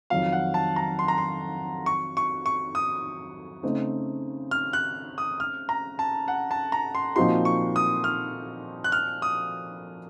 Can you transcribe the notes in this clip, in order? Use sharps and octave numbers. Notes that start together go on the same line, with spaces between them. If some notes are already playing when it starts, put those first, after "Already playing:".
F2 D#3 F#3 F5
F#5
A5
A#5
C6
A#5
C6
C#6
C#6
C#6
D#6
C#3 A3 C4 D#4
F6
F#6
D#6
F6
A#5
A5
F#5
A5
A#5
C6
A#2 F3 C4 D#4 F#4 C6
C#6
D#6
F6
F#6
F6
D#6